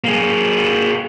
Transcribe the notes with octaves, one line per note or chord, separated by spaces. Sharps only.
A#3 G#4